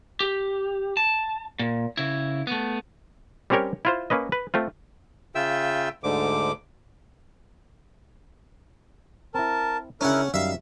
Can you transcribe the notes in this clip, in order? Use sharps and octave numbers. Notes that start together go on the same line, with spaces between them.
G4
A5
A#2
C#3 E4
A3 B3
G3 C4 C#4 G4 A#4 C#5
E4 F4 C5
A#3 C#4 B4 D#5
B4
A3 C4 F4
C#3 F4 E5 G5 E6
D2 G#2 D3 D6
C4 E4 A#4 A5
C#3 C#4 D4 E4 A#4 F#5
F#2 G3 D#4 E5 F5